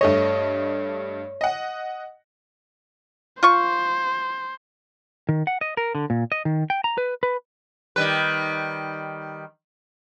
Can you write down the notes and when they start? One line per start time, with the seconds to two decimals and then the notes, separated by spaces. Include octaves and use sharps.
0.01 G2 A3 C#5 D#5
1.41 D#5 F#5
3.43 F4 C5 C#6
5.29 D#3
5.47 F#5
5.61 D#5
5.77 A#4
5.95 D3
6.10 A#2
6.32 D#5
6.45 D#3
6.70 G5
6.84 A#5
6.98 B4
7.23 B4
7.96 D#3 G3 B4